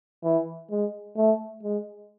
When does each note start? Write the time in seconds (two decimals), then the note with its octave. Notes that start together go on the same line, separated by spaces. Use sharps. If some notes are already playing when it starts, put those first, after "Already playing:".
0.24 E3
0.71 G#3
1.17 A3
1.63 G#3